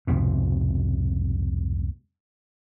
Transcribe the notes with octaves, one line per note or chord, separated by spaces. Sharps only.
C2 F2 G#2 B2